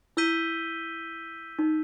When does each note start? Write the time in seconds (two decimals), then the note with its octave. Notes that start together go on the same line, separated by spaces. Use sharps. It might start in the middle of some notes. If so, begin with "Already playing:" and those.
0.17 E4 E6 G6 B6 D#7 G7
1.59 D#4